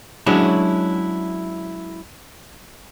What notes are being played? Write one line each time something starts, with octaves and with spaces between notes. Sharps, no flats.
F#3 G#3 C#4 D4 E4